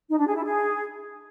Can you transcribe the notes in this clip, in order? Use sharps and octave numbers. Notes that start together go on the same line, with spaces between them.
D#4
D4
G#4
E4
G#4